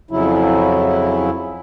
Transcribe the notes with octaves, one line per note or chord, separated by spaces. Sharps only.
F2 C#3 F#3 E4